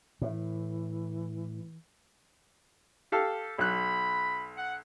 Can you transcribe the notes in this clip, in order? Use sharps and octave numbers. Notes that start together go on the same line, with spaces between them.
A2 E3
G4 A4 F5
B1 B5 F#6
F#5